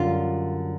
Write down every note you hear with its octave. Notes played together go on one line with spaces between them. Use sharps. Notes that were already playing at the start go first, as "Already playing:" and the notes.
Already playing: F#2 D3 G3 F4